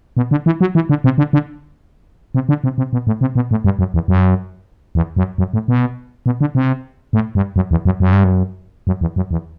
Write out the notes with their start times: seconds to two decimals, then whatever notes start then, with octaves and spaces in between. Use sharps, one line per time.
0.17 B2
0.31 D3
0.46 E3
0.61 F#3
0.75 E3
0.89 D3
1.04 C3
1.18 D3
1.33 D3
2.35 C3
2.49 D3
2.64 C3
2.78 C3
2.93 B2
3.07 A2
3.21 C3
3.35 B2
3.51 A2
3.64 G2
3.79 F#2
3.94 E2
4.08 F#2
4.95 E2
5.17 F#2
5.38 F#2
5.53 A2
5.68 B2
6.26 B2
6.41 D3
6.55 C3
7.13 A2
7.35 G2
7.56 F#2
7.71 E2
7.85 F#2
8.00 F#2
8.12 G2
8.24 F#2
8.87 F#2
9.01 E2
9.16 F#2
9.31 E2